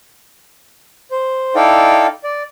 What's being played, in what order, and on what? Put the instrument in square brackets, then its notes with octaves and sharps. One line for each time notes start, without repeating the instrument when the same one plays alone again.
[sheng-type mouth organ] C5
D#4 E4 A4 D5 F5 G5
D5